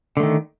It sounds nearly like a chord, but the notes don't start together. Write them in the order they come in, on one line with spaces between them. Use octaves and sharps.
D3 A3 D#3